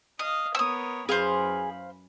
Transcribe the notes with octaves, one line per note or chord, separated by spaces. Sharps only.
D#5 F5 D#6
B3 A#4 C#5 D#6 E6
F#2 E3 G#4 C5 F5 B5